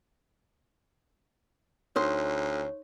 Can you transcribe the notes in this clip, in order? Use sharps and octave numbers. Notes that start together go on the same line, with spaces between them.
D2 D#4 C5 C#5